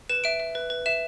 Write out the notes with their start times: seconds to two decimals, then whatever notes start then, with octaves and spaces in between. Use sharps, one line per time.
0.10 B4 E7
0.24 E5 D7
0.40 E5
0.55 B4
0.70 B4
0.86 E5 E7